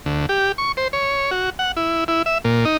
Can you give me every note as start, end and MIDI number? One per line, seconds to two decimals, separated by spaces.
0.06 0.26 38
0.29 0.52 67
0.58 0.72 85
0.77 0.88 72
0.93 1.31 73
1.31 1.50 66
1.59 1.72 78
1.77 2.04 64
2.08 2.22 64
2.26 2.38 76
2.44 2.65 46
2.65 2.77 63